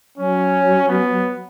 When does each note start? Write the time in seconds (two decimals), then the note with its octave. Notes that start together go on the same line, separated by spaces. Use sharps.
0.18 F#3 C#4
0.88 B3